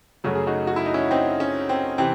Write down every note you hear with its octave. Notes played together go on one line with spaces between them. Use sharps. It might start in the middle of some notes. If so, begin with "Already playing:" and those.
F#2 C#3 F#3 A3 F#4
G#4
D#4 F#4
F#4
E4
D#4
C#4 E4
C4 D#4
C#4
C4
C3 E3 C4